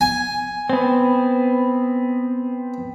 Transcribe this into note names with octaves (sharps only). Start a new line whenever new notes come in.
G#5
B3 C4